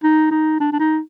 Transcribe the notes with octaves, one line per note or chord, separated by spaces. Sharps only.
D#4
D#4
D4
D4
D#4